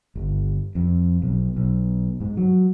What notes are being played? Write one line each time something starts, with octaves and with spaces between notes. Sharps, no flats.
G1
F2
B1
B1
G#2
F#3